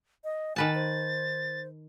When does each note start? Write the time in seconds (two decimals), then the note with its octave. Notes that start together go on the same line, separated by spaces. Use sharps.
0.24 D#5
0.56 D#3 B4 G#5 A5 A6
0.75 C5